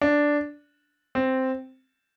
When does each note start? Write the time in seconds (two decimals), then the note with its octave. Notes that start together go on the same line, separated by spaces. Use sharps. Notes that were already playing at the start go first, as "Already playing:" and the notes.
0.01 D4
1.15 C4